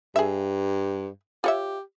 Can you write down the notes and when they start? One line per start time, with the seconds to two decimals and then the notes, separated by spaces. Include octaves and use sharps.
0.16 G2 G#4 E5
1.44 F4 G4 C#5 E5